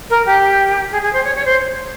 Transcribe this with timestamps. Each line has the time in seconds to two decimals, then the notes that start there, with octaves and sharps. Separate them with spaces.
0.09 A#4
0.25 G4
0.91 G#4
1.01 G#4
1.12 C5
1.24 C#5
1.35 C#5
1.45 C5